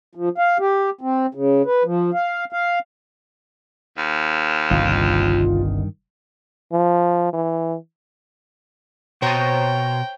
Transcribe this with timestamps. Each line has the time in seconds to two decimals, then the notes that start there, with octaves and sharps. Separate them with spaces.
0.15 F3
0.38 F5
0.60 G4
1.01 C4
1.35 C#3
1.65 B4
1.84 F3
2.14 F5
2.53 F5
3.98 D#2
4.71 G1 C2 G2 B2 D#3 F4
6.73 F3
7.33 E3
9.22 B2 C5 C#5 G5 A5 A#5